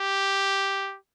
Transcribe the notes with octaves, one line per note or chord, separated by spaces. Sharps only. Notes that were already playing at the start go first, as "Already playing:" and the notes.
Already playing: G4